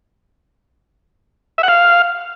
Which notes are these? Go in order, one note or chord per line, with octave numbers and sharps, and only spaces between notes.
E5
F#5
F5